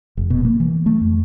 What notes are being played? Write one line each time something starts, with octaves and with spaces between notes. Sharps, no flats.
F1
B2
A#3
E3
A3
F2